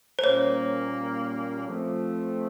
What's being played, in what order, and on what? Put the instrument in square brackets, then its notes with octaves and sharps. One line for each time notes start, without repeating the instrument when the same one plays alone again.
[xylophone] C5
[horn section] A#2 G3 A#3 C#4 [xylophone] C#5
[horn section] F3 A3 C4